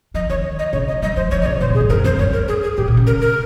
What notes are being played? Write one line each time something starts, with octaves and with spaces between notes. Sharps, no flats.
F3 D#5
D#3 C#5
D#5
C#3 C#5
D#5
G3 D#5
F3 C5
F3 C#5
D#5
C#3 C#5
C3 C5
A#2
G#4
G#2
G2 A#4
F2 C5
G2 C#5
A#4
G#4
G#4
G#2 G4
A#2
C#3
A#4
A#4